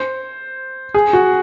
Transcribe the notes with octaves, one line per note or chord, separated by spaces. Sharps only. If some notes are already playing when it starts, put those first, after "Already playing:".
Already playing: C5
G#4
F#4